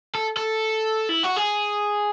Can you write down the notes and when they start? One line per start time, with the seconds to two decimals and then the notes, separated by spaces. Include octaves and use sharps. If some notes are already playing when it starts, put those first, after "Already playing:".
0.15 A4
0.37 A4
1.09 E4
1.23 F#4
1.36 G#4